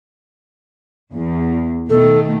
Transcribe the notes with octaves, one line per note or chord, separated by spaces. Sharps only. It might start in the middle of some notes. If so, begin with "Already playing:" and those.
E2
B2 D#3 A3 A4